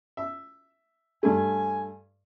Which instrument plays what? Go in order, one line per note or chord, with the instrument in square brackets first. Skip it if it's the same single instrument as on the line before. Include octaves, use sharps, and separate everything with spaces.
[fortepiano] E5
[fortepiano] G2 A3 [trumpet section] G#5